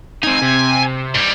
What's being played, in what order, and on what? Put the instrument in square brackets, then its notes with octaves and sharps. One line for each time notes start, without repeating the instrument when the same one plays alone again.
[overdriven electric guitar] C4 D#4 [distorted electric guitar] G#5
[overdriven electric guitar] C3
[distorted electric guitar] G#2 G3